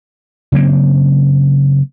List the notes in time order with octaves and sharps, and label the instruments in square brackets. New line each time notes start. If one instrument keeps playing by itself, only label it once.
[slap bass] C#3 F#3 A#3 C4